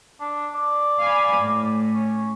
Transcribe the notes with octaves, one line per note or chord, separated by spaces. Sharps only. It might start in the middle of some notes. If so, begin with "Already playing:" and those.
D4
D5
F5 G#5 B5
A2
C#4